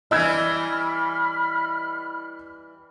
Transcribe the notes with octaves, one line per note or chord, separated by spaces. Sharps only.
E3 G3 E4 D#5 B5 E6 F6 G#6